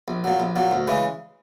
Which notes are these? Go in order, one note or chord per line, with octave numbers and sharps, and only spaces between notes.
A#1
A#2 F#3
A#1
A#2 F#3
D2
C#3 E3 G#3